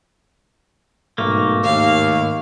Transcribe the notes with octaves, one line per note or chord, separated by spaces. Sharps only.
B1 G#2 A3 A#3
D#2 F5